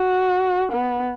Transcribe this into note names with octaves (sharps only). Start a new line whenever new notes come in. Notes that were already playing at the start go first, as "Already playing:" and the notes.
Already playing: F#4
B3